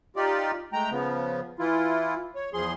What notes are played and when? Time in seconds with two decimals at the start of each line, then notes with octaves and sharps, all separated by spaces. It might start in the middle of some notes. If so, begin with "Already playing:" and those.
0.16 D#4 F4 G4 D5
0.73 G#3 A3 G5 A#5
0.91 C#3 F3 B3
1.59 E3 E4 F4
2.35 C#5
2.53 E2 F3 G#4 C6